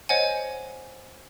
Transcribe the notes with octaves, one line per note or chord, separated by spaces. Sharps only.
C5 C#5 D#5 F#5 G#5